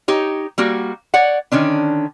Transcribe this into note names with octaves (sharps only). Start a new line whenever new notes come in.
D#4 G4 C#5
G3 A#3 F#4
C#5 D5 F#5
D3 D#3 C#4 D4